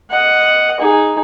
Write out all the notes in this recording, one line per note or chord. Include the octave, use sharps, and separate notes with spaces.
D#5 F#5
D#4 G#4